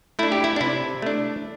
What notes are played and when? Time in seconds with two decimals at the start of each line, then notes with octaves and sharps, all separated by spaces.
0.19 A3 D4 E4
0.32 G4
0.44 E4
0.56 D4
0.61 C3 E4
1.02 A3 D4